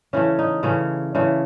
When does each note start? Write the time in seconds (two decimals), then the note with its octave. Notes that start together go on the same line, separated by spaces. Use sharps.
0.13 C#3 E3 A3 C#4
0.39 D#4
0.63 C#3 E3 A3 C#4
1.15 C#3 E3 A3